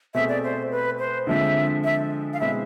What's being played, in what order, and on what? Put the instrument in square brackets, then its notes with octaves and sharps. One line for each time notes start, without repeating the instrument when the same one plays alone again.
[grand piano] B2 A3 C4 G#4 [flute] E5
[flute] D5
C5
B4
C5
[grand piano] D3 F3 G#3 C4 [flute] E5
[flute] E5
F5
[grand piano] B2 G#3 C4 E4 [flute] E5